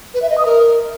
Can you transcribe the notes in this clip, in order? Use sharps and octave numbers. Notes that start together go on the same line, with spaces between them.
B4
E5
D#5
D#6
A#4